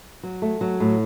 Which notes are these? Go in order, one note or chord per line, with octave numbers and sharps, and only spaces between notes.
F#3
A3
F#3
A2